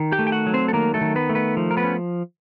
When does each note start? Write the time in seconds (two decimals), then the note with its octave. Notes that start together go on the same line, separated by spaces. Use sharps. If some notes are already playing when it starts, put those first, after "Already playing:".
Already playing: D#3
0.12 G4 G5
0.19 A3
0.27 G5
0.32 F#4 F#5
0.47 F#3
0.54 C4 C5
0.68 A4
0.73 D#3 A#3 A#4
0.94 A3 A4
1.01 D#3
1.16 B3 B4
1.29 A3
1.35 B3 B4
1.57 F3
1.71 A#4
1.77 B3 B4
1.84 C#4